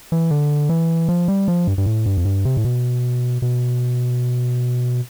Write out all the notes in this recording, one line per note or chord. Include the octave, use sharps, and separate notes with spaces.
E3
D3
E3
F3
G3
F3
G2
G2
A2
G2
F2
G2
C3
A2
B2
B2